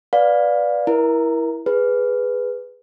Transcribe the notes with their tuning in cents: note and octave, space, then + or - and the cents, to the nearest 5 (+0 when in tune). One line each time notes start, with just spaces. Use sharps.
B4 +0 D5 +0 F5 +20
E4 +0 A#4 +25
G#4 -5 B4 +5